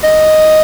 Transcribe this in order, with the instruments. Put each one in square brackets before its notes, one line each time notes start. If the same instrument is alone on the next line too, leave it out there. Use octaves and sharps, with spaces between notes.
[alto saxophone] D#5